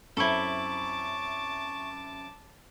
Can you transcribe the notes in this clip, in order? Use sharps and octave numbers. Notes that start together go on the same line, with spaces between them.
F#2 C4 E4 A4 E5 A5 C#6 D6